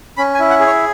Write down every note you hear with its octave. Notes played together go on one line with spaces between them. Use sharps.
C#4 B5
G#5
E4
F#5
G#4
C#5